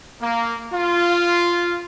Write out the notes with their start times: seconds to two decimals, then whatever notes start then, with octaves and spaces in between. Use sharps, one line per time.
0.21 A#3
0.73 F4